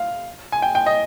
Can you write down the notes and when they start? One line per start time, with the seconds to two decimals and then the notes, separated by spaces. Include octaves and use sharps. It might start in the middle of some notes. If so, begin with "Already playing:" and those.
Already playing: F5
0.52 G#5
0.62 G5
0.75 G5
0.86 D#5